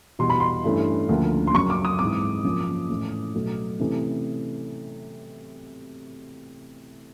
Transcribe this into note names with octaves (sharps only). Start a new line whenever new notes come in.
E2 B2 G3 C6
B5
C6
G2 E3 A3 C#4
D2 C#3 F3 A#3
C6
F#2 C#3 F#3 C#6
D6
D#6
G#2 E3 G#3 C4 D6
F#2 C#3 F3 A#3 C#4
A2 E3 A3 C#4
B2 F#3 A3
C3 E3 A3 C#4